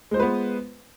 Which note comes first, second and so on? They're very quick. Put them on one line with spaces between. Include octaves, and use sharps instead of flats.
G#3 C5 F4 B4 B3